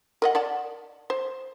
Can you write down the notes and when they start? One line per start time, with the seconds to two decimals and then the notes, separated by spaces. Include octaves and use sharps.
0.22 A#4 D#5 F#5
0.35 D5 F#5 A5
1.10 C5